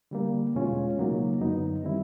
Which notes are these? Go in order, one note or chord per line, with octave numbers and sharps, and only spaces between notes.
D3 G3 A#3
E2 B2 G#3 C#4 F4
C#3 F#3 A#3 D#4
F#2 D3 F#3 B3 D#4
D#3 G3 C4 E4